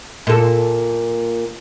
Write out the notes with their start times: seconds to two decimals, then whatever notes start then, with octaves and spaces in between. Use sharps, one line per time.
0.27 A#2 A4